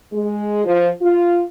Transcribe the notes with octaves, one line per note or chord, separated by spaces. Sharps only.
G#3
F3
F4